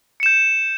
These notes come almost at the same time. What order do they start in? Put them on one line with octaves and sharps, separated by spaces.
C#7 E7 G6